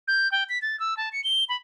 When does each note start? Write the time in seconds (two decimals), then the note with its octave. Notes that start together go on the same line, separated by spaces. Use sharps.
0.08 G6
0.32 G5
0.49 B6
0.62 A6
0.80 E6
0.97 A5
1.13 C#7
1.24 G7
1.49 B5